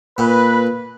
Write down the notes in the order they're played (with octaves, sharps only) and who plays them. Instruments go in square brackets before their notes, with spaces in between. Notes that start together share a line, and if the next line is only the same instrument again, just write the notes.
[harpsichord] A#2 [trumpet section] B4